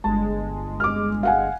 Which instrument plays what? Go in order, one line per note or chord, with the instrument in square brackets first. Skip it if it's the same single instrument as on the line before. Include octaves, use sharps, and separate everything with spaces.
[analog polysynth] G1 G#3 [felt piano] A5
[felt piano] D6 F6
F5 F#5 G#5